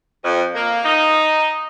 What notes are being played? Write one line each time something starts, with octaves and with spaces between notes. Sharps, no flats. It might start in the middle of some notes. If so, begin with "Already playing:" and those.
F2
A#3
D#4